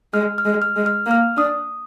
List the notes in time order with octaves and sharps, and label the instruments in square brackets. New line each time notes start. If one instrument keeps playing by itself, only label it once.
[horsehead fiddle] G#3 [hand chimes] F6
[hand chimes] F6
[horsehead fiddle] G#3
[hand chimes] F6
[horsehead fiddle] G#3
[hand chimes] F6
[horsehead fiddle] A#3
[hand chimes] F6
[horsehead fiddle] D4 [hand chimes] D#6